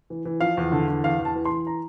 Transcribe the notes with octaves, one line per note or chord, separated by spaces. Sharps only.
E3
E3
F3 F5
E2
D3
E2
E2 F5
E2
A5
E3
C6
E3
A#5